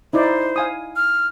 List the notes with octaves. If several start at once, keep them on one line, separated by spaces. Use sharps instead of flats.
D#4 E4 C5 D5
F5 G#5 D#6
F6